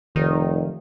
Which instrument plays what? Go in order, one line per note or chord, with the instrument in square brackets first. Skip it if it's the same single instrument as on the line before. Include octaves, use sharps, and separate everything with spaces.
[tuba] F1 [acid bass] D#3